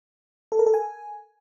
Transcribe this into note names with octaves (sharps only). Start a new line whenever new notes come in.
A4
A#4
A4
G#5